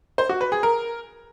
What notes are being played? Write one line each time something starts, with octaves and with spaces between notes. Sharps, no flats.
C5
F#4
B4
G#4
A#4